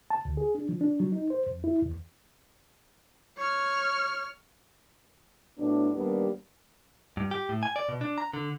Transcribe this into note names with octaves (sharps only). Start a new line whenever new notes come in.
A5
D2
G#4
D4
F3
D4
F#3
D#4
C5
F2
E4
E2
C#5 F6
A2 F#3 B3 D4
D#2 G3 A#3 B3 D4 G4
G2
G4
A2
G#5
D5
B2
D4
A#5
D3